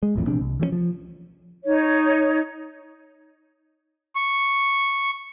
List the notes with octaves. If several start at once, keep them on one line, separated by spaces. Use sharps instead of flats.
G#3
D#1 A1 F2 A2
A#1 E2 C3 D4
C2
E3 F3 G#3 C#4
F3
D#4 C#5
C#6